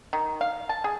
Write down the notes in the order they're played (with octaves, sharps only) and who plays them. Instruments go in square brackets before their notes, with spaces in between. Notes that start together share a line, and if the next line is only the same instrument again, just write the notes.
[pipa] D#3
F5
A5
G#4